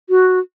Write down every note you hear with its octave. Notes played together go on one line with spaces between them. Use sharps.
F#4